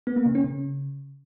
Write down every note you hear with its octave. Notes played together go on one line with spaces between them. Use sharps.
B3
A#3
C#3
C#4
C#3